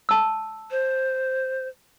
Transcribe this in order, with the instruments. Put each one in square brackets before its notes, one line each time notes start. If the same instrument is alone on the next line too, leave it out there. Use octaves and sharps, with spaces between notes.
[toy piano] A5 E6
[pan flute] C5